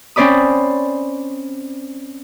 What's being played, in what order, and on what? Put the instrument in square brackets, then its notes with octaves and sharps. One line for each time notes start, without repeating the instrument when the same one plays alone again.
[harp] C4 C#4 C5 D5 B5 D#6